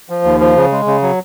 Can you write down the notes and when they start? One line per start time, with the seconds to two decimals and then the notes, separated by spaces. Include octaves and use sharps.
0.10 F3
0.24 D#2
0.40 F3
0.56 C#3
0.72 G#3
0.87 C#3
1.02 F#3